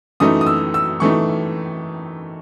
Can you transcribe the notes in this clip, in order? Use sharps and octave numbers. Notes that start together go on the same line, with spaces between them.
F#2 E3 A3 D#4 D#6
D#6
E6
E6
F#2 E3 A3 D#4 C#6